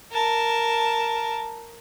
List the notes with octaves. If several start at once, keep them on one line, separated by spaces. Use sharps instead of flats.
A#4 A5